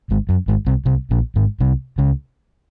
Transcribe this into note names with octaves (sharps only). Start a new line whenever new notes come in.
G#1 G#2
F#2
G#1 G#2
C2 C3
C2 C3
A#1 A#2
G#1 G#2
C2 C3
C#2 C#3